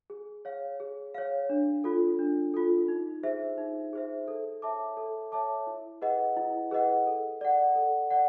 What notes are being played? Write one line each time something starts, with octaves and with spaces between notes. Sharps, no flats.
G#4
C#5 F5
G#4
C#5 F5
D4
F4 A4
D4
F4 A4
D#4
G#4 C5 E5
D#4
G#4 C5 E5
A4
C#5 E5 A5 D6
A4
C#5 E5 A5 D6
E4
G#4 B4 D#5 F#5
E4
G#4 B4 D#5 F#5
A4
D5 F#5
A4
D5 F#5